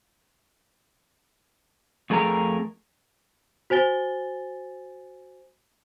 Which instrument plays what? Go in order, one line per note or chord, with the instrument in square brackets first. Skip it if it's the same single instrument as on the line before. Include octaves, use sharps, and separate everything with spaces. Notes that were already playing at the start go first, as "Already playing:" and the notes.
[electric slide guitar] F2 A3 G#4 A#4 A#5
[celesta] F#4 C5 G#5 A6 G7